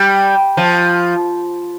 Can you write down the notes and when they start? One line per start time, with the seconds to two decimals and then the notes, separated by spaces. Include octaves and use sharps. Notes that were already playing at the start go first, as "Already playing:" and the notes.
Already playing: G3
0.57 F3